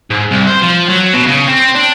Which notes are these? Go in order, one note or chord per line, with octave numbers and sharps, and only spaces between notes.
G#2
C2
C5
F3
F#3
B2
C#3
C4
D4